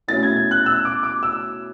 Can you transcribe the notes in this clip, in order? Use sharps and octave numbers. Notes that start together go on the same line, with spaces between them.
B2 A3 C#4 E4 A6
G#6
G#6
F#6
E6
D6
D6
E6